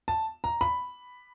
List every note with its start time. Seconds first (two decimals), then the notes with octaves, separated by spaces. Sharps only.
0.08 A5
0.44 A#5
0.61 B5